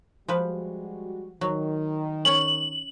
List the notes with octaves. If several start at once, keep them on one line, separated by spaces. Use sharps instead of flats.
F3 G3 G#3 F#4 B4
D#3 F#3
C#4 C#5 F#7